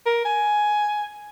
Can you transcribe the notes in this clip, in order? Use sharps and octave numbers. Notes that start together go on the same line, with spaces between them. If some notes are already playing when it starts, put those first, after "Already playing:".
A#4
G#5